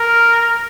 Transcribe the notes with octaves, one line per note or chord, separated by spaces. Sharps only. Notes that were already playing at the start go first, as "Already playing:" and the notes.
Already playing: A#4